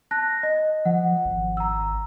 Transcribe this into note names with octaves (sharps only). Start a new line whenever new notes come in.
A5 F#6 A#6
D#5
F3 F#5
G#1
A#5 E6